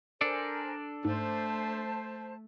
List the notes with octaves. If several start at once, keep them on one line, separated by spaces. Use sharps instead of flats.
D4 A4 A#4 C5 D5 G#5
G#2 A3 C5 A5